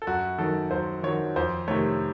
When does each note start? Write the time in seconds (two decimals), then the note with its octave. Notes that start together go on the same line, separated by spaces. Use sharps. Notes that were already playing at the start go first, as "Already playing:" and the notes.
0.02 A4
0.07 F#2 F#4
0.38 D#3 F#3 A4
0.71 F#2 C5
1.03 D#3 F#3 C#5
1.36 F2 C5
1.68 C3 D#3 A3 C#5